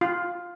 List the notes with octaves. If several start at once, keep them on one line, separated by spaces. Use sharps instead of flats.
F4